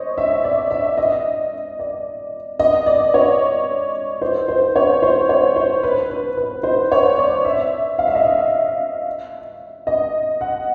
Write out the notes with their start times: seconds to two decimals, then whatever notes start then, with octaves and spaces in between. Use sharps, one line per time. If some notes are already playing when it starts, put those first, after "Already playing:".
Already playing: C5 C#5 D#5
0.18 E5
0.44 D5
0.71 E5
0.97 D#5
1.79 D5
2.59 D#5
2.86 D5
3.14 C#5
4.21 C5
4.48 C5
4.76 C#5
5.02 C5
5.29 C#5
5.56 C5
5.83 B4
6.10 B4
6.37 B4
6.63 C5
6.92 C#5
7.18 D5
7.45 E5
7.99 F5
8.08 E5
8.15 D#5
8.24 E5
9.87 D#5
10.41 F#5